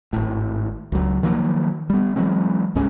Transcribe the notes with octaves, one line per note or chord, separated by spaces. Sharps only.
G#1 A2
C#2 F#3
D#3 F3 F#3 A#3
G3 B3
E3 F#3 G#3 C4
C2 G2 G#3 C#4